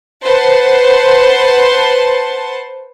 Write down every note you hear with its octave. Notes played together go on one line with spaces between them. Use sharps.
B4 C5 F#5 A5 C6